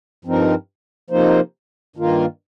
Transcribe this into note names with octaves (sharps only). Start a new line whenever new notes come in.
G2 F3 C4 D#4 A#4
C3 F3 A#3 D#4 C5
G2 D#3 A#3 F4 A#4